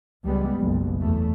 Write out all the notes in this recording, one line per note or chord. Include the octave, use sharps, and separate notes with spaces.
C#2 G3 G#3 B3
F#1 B1
E2 A3